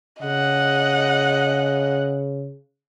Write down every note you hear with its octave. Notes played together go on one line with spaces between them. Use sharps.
C#3 D#5 F#5